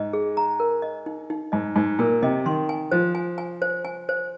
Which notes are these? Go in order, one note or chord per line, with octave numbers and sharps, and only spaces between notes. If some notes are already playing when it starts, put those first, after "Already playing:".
Already playing: G#2 D#5
G#4
A#5
A#4
D#5
D#4
D#4
G#2 D#5
G#2 D#4
A#2 A#4
C3 D#5
D#3 C6
G#5
F3 C5
G#5
G#5
C5
G#5
C5